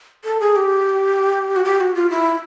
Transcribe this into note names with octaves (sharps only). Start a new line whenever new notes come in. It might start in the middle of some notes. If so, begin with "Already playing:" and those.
A4
G#4
G4
F#4
G4
F#4
F4
E4